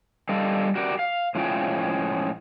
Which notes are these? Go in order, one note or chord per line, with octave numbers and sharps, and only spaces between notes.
D3 G3 A4 D#5 F5
F#4 G4 A#4 D5
F5
A2 F3 G#3 C#4 F4 G5